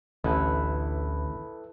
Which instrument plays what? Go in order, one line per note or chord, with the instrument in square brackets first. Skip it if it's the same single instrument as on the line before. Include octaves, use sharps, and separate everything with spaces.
[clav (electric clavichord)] A1 [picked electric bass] D2 D3 [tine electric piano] E4 A4 B4